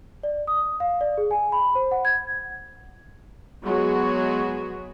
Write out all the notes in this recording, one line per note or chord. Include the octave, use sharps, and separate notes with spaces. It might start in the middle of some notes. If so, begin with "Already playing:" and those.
D5
D#6
F5
D5
G#4
G#5
B5
C5
F#5
G#6
F#3 G#3 B3 F#4 G#4 C#5